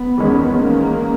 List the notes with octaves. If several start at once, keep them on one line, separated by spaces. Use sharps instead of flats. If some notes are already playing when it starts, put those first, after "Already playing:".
Already playing: B3
E2 D#3 G#3 C#4
A#3